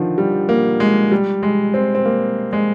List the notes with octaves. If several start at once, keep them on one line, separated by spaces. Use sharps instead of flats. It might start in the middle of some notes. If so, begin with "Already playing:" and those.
Already playing: D3 D#3 F3
G3
A#3
G#3
G3
G#3
C4
C4
A#3
G#3